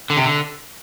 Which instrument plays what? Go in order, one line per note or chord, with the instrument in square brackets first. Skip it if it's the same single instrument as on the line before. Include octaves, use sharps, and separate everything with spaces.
[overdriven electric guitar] D3
C3
D3